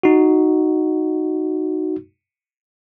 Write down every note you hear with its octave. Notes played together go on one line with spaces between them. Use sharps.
D#4 F#4